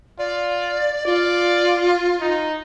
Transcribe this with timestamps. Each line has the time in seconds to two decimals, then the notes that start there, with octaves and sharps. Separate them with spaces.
0.19 F4 D5
1.06 F4 D5
2.21 D#4